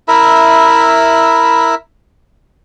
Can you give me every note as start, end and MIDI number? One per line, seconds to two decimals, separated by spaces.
0.08 1.75 64
0.08 1.75 70
0.08 1.75 76
0.08 1.75 83